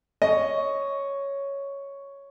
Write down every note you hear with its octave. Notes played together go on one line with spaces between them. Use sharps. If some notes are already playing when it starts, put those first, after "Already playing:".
C#5 D#5